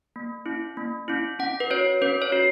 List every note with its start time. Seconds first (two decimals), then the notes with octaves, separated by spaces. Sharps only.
0.16 A#3
0.46 C#4 E4
0.77 A#3
1.08 C#4 E4
1.39 C#4 F#5
1.60 B4
1.70 F#4 C#5
2.02 C#4 B4
2.22 C#5
2.32 F#4